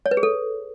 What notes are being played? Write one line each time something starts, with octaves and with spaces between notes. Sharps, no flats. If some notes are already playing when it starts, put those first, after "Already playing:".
C#5
B4
G#4
A4